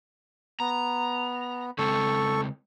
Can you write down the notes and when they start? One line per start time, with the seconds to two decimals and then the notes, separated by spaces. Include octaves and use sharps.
0.60 B3 A#5
1.78 C#3 G#3 C4 A4 C#6